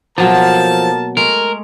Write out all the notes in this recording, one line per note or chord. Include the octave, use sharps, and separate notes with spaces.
B2 F3 F#3 A#3 A4 A#4 A5
G#3 A3 A#4